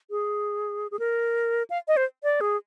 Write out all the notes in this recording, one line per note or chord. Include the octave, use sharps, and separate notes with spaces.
G#4
G#4
A#4
F5
D#5
C5
D5
G#4